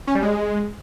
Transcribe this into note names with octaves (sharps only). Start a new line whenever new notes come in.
C#4
G3
G#3